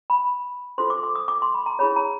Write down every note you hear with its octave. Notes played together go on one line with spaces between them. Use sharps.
B5
F4 A4 C5 C6
D6
D6
D#6
D6
C6
B5
A#5
E4 G#4 C#5 B5
A#5